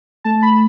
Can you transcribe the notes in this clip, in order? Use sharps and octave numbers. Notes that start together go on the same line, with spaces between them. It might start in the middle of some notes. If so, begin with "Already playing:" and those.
A3 A5
B5